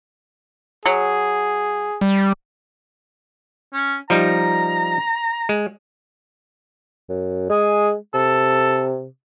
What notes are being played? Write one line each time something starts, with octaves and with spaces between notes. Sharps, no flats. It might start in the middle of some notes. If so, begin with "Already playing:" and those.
F#3 G#4
G3
C#4
F3 G3 D#4 A#5
G#3
F#2
G#3 G#4
C3 A4